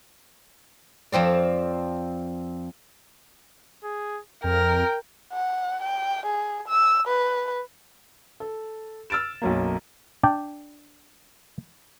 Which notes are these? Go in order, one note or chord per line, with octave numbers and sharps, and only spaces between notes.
F2 F3 C4 D5
G#4
F2 A#4 G5
F#5
G5
G#4
E6
B4
A4
E6 F6 A6 D7 E7
B1 F#2 A#3
D4 D5 G5